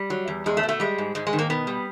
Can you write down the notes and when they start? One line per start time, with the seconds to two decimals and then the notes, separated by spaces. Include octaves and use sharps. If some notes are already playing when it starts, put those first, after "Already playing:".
Already playing: G3
0.10 F#3
0.28 E2
0.46 E2 G#3
0.57 A3
0.63 B2
0.69 A3
0.80 G3 G#3
0.98 G#2
1.15 G#2 G#3
1.27 G#3
1.33 D#3
1.39 A#3
1.50 B2 B3
1.67 G3